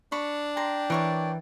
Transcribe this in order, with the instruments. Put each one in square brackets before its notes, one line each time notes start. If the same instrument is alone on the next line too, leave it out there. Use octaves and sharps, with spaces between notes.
[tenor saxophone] D4 [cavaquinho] B5 C#6
[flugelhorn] G5 [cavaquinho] A#5 C6
[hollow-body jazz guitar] E3 [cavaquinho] A#4 C#5 D5